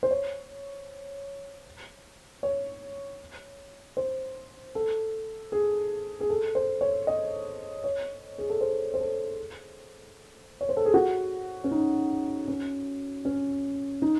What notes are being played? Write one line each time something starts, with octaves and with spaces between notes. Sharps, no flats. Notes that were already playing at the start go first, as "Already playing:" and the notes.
C5
C#5
C#5
C5
A4
G#4
G#4
A4
C5
C#5
D#5
C#5
G#4
A4
C5
C5
A4
C#5
C5
A4
G#4
F#4
C#4
D#4
C#4
C#4
D#4